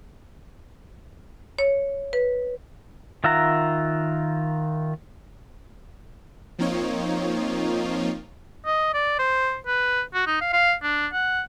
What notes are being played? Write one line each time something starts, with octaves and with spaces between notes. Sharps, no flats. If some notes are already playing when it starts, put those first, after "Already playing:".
C#5
B4
D#3 F4 E5 F#5 A#5
F3 A#3 C4 D#4 F4 C#5
D#5
D5
C5
B4
F#4
D#4
F5
F5
D4
F#5